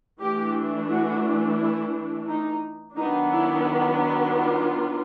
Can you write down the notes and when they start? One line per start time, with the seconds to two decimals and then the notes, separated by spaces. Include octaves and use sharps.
0.21 E3 A3 D4 G4
0.90 F#4
1.59 E4
2.29 D#4
2.97 D#3 F#3 B3 D4 D#4
3.32 E4
4.35 F4